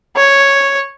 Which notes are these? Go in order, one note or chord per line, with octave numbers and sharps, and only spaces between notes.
C#5